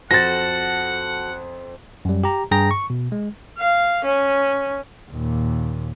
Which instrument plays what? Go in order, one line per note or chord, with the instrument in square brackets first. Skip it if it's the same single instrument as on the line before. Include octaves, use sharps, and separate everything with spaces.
[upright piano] F2 C4 C5 [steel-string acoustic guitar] F#4 A4 [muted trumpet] F#5 [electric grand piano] A6 A#6
[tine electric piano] F#2 G3
G4 A#5
G2 G#4 G5 A#5 A#6
C#6
B2
G#3
[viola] F5
C#4
[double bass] D#2 A#2